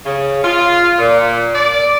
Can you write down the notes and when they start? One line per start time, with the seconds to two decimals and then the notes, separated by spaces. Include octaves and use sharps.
0.06 C#3
0.44 F4
0.99 A#2
1.55 D5